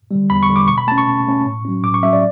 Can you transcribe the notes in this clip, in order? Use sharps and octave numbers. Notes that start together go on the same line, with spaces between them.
D3 G3
E2 B5
C#6
D3 G3
D6
B2 C#6
B5
A3 C#4 A5
C#6
B2
A3 C#4
A2
F#3 C#4
A2 D6
C#6
F#3 C#4 E5
D5